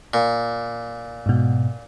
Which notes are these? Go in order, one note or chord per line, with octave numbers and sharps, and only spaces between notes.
A#2
G#2 B2